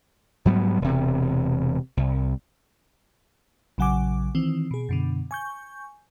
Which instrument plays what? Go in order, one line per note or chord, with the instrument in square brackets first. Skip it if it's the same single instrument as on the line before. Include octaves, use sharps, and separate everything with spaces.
[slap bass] G#2 F#3 G3 B3
E1 C3
C2
[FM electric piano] A#1 C#3 F#3 F#5 G#5 D6
D#3 E3 C4
B2 G#4
F#2 B2 D3
G#5 C#6 G6